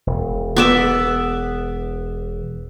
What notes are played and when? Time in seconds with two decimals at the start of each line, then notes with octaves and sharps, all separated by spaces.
0.07 E1
0.56 B3 D5 E5